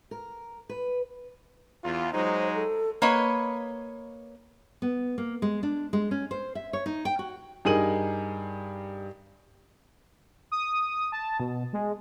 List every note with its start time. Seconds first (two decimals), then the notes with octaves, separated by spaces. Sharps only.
0.11 A#4
0.69 B4
1.84 E2 F4
2.13 F#3 G#3 D#4 C5
2.55 A4
3.02 A#3 B4 C#5 D#5
4.82 B3
5.18 A#3
5.42 G#3
5.63 D4
5.93 G#3
6.11 C#4
6.31 C5
6.55 E5
6.73 C#5
6.86 D#4
7.05 G5
7.19 F#4
7.65 G2 D#4 G#4 A#4 D#7 F#7
10.52 D#6
11.12 A5
11.40 B2
11.73 G#3